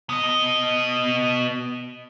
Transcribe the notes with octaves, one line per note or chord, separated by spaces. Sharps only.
B3 D#5